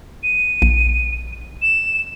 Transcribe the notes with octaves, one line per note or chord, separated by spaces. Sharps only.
D#7
A#1
E7